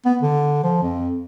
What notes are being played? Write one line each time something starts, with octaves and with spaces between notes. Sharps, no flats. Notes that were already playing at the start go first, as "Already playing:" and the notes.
B3
D3
F3
F2